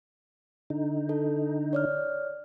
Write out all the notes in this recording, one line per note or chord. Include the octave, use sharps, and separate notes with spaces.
D3 D#4
A4
C#5 D5 F6